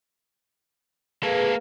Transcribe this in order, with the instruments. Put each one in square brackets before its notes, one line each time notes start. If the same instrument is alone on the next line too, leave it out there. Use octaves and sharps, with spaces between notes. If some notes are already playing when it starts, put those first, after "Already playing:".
[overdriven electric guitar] A#3 A4 [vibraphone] G#4 B4 F5